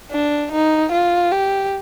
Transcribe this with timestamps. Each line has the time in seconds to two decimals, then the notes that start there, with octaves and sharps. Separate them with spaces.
0.11 D4
0.52 D#4
0.92 F4
1.32 G4